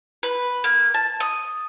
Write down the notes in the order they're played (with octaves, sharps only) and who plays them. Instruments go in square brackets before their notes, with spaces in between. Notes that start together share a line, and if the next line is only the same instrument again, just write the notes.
[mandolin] B4
A#3
A5
D#6